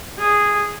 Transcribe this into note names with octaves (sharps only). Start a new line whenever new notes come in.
G#4